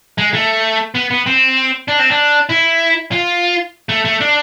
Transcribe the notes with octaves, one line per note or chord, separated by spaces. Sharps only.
G#3
A3
B3
B3
C4
D4
C4
D4
E4
F4
A3
A3
D4